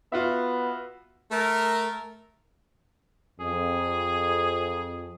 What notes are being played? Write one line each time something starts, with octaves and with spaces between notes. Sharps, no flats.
B3 F4 F#4 E5
A3 A#4
F2 G#4